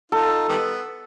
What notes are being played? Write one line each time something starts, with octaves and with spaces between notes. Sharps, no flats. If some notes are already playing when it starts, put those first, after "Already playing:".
D#4 F4 A4
D#3 G3 B3